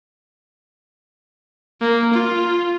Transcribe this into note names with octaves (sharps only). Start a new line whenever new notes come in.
A#3
F4